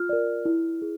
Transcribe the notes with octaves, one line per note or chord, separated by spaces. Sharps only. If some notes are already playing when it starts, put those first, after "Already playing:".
Already playing: F4 F6
A#4 D5
E4
G#4